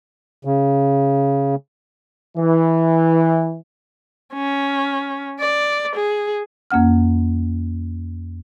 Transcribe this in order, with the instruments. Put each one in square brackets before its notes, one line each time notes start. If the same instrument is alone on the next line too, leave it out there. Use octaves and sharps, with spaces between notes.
[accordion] C#3
[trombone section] E3
[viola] C#4
D5
G#4
[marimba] F2 A#3 C#4 F#5 F6